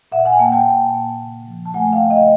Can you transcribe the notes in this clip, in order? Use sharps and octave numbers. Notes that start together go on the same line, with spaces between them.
A#2 E5 F#5
F#5 G#5
A#3 G5 A5
G5 A5
A#2
A#3
C#3
F3
A5
A3 F#5 G#5
F5 G5
C#3
D#5 F5